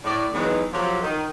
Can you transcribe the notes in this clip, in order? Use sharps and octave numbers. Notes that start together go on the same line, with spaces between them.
A2 D5
D#3 E3 F#3 G#3 B3 D#4
F3 F#3 F4 G4 A4 C#5
D#3